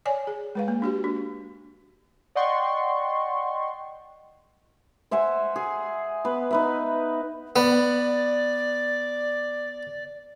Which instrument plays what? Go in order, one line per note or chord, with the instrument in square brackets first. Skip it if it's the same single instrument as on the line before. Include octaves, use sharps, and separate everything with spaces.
[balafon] C#5 D5 G#5
G#4
G#3 B4 F5
A#3
D4 F#4 G4
D4
[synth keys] D5 D#5 F#5 G5 C6 C#6
[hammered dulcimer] C5 E5 F#5 G#5
G#4
B3 B4
D#4 B4 E5
[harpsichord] B3 [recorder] D5